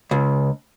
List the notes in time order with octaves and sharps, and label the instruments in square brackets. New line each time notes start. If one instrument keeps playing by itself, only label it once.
[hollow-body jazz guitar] C#2